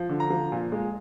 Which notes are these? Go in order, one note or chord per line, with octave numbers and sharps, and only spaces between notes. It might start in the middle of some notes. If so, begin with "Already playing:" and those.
Already playing: F3
D3
A#5
F3
A#2
G#3